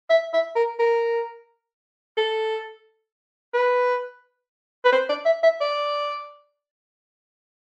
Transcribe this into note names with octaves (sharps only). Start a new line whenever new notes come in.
E5
E5
A#4
A#4
A4
B4
B4
C5
D5
E5
E5
D5